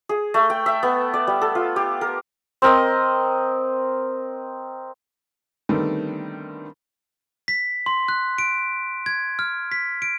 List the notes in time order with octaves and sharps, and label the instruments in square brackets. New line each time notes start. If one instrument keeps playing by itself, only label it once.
[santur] G#4
A3
G5
E5
B3
D5
G3
A4
F4
G4
A#4
C4 A#4 D#5
[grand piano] D3 D#3 G3 A3 B3 C4
[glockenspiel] B6
C6
F#6
D7
G#6
F6
B6
D7